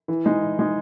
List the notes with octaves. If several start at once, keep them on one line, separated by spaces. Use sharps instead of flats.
E3
G#3 D#4
E3
G#3 D#4